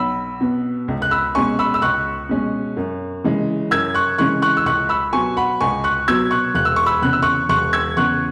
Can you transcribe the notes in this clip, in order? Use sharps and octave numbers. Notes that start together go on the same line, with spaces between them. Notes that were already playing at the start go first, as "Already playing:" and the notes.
Already playing: B1 B5 E6
B2 B3
C#2
F#6
B5 E6
B2 G#3 C#4 G#5 C#6
B5 E6
E6
C#2 C#6 F#6
B2 G#3 C#4
F#2
C#3 E3 G#3 C#4
F#2 E6 G#6
C#6 F#6
C#3 E3 G#3 C#4 C#6 F#6
C#6 F#6
E6
C#2 C#6 F#6
B5 E6
B2 F#3 B3 G#5 C#6
F#5 B5
C#2 G#5 C#6
C#6 F#6
B2 F#3 B3 E6 G#6
C#6 F#6
E1 F#6
E6
C#6
B5 E6
E2 C#3 F#6
E6
C#6 F#6
E1 C#6 F#6
E6 G#6
E2 C#3 C#6 F#6